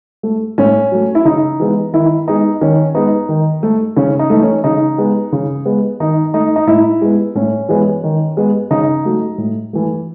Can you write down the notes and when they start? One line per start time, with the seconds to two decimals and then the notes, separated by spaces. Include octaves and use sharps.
0.23 A3
0.58 A2 C#4
0.92 F#3 A3
1.15 E4
1.25 C#3 D#4
1.60 E3 G#3 B3
1.93 D#3 E4
2.27 G#3 B3 D#4
2.61 D#3 C#4
2.94 G#3 B3 D#4
3.29 D#3
3.63 A3
3.96 C#3 C#4
4.19 D#4
4.30 E3 A3
4.42 C#4
4.64 C#3 D#4
4.98 G#3 B3
5.32 C#3
5.65 G#3 B3
6.00 D#3 D#4
6.34 A3 D#4
6.56 D#4
6.67 A2 E4
7.02 G#3 B3
7.35 A2 C#4
7.69 E3 G#3 B3
8.04 D#3
8.37 G#3 B3
8.71 C#3 D#4
9.05 F#3 A3
9.38 A2
9.73 E3 A3